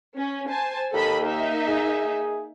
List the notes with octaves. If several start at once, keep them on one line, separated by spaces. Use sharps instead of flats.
C#4
C5 G#5 A5
D#2 A4 D#5 B5
A#3 D#4 E5
G#4